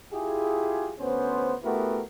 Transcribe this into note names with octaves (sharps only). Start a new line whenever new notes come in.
E4 F4 G4 G#4
D2 B3 C#4 C5
A3 B3 E4 F#4 G4 A#4